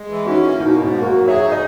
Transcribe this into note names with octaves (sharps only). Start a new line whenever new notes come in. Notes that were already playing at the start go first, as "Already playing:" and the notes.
Already playing: G#3
E3
C#4 D#4 F#4
A#3 E4
B2 D#4 F#4
G#2 D#4 F#4
A#3
F#4 A#4
F#3
G#4 C#5 E5
D#4
D#5